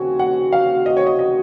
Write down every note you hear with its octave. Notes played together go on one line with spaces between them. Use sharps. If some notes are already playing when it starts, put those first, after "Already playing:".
Already playing: D#2 C#3 F3 C4 F#4 G#5
F#5
F5
D#5
C#5
D#5
D#5